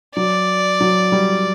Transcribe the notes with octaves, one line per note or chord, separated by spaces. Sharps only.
F#3 D5
F#3
G3